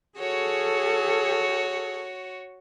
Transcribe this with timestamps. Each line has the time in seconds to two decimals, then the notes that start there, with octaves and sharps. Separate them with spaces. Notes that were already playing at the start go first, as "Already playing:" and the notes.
0.19 F#4 G#4 A4 C#5